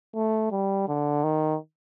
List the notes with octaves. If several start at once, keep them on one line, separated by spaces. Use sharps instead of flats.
A3
G3
D3
D#3